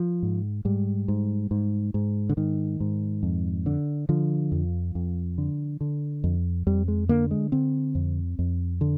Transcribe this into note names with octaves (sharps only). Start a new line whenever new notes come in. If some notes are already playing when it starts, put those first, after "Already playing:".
Already playing: F3
G#2
G#2 G3
G#2
G#2
G#2
D3
G#2 D#3
G#2
F2
D3
D3 F3
F2
F2
D3
D3
F2
F2 G3
G#3
D3 A#3
G#3
D3 C4
F2
F2
D3